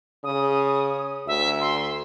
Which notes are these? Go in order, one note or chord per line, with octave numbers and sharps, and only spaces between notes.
C#3 D#6
D2 E5
C6